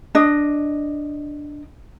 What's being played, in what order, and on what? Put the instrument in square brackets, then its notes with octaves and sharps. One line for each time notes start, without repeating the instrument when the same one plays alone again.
[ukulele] D4 D#5